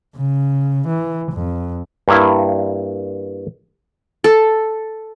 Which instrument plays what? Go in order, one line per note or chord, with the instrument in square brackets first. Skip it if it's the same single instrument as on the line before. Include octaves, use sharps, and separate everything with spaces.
[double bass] C#3
E3
F2
[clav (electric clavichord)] G2 A#3 E4
[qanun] A4